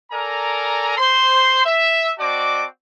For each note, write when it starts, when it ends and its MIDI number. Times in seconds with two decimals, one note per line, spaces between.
0.11 0.94 69
0.11 0.94 70
0.11 0.94 74
0.11 0.94 80
0.11 0.94 82
0.97 1.63 72
0.97 1.63 84
1.65 2.12 76
2.18 2.65 60
2.18 2.65 66
2.18 2.65 74
2.18 2.65 75
2.18 2.65 81
2.18 2.65 86